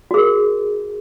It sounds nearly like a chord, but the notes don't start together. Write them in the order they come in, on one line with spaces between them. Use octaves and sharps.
F#4 G#4 A#4